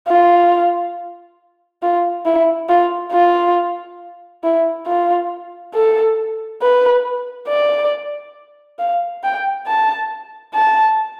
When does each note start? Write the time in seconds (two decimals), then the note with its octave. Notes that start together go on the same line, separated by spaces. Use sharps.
0.08 F4
1.83 F4
2.25 E4
2.69 F4
3.12 F4
4.44 E4
4.87 F4
5.75 A4
6.62 B4
7.49 D5
8.79 F5
9.24 G5
9.67 A5
10.54 A5